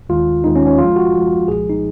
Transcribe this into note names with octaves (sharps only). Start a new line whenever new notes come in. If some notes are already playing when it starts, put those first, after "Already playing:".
D#2 D#3 G#3 F4
D#2 D#3 G#3 D#4
C#4
C#4
F#2 F3 G#3 F4
F#4
F#2 F3 G#3
C2 A#2 F3 G#3 G#4
D#4